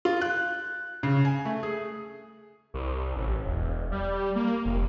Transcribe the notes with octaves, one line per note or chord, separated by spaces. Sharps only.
F4
F#6
C#3
G#5
A3
G#4
C2
A1
E1
G3
A#3
F1